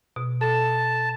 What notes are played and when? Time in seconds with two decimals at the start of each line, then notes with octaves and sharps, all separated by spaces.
0.16 B2
0.41 A4 A5